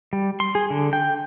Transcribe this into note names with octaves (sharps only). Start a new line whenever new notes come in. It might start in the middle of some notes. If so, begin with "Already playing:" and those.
G3
C6
G#4
D3
G5